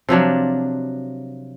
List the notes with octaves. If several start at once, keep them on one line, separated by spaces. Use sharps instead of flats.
C3 F3 F#3 D4